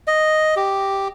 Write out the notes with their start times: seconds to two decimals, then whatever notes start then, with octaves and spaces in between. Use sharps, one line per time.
0.07 D#5
0.56 G4